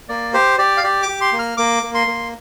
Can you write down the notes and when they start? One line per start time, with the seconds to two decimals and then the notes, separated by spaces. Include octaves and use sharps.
0.09 A#3 D5
0.34 G4 C5
0.58 G4 D5
0.77 F5
0.84 G4 D5
1.03 D6
1.08 G4
1.21 C6
1.33 A#3
1.39 F6
1.57 A#3 D6
1.83 A#3
1.95 C6
2.07 A#3